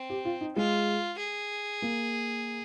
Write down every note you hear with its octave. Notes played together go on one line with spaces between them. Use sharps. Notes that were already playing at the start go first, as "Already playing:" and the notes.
Already playing: C4
G4
F4
D#4
G#3 F4
G#4
A#3